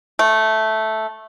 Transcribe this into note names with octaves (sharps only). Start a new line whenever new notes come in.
A3